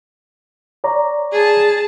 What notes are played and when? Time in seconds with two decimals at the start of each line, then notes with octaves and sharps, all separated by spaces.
0.84 C#5 D5 A#5
1.32 G#4 A5